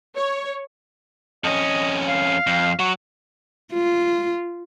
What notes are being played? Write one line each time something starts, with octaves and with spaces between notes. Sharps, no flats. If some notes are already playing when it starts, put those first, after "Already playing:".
C#5
F2 C#4 D#5
F5
F2
F#3 C#6
F4